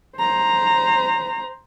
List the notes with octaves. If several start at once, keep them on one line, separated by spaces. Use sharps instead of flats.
C5 A#5